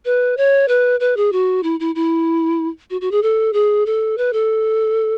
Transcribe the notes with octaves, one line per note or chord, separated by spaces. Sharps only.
B4
C#5
B4
B4
G#4
F#4
E4
E4
E4
F#4
F#4
G#4
A4
G#4
A4
B4
A4